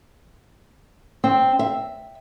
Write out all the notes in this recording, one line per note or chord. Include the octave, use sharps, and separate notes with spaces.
C4
E5